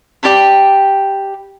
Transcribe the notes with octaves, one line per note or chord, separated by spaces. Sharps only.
G4 D5 A5 B5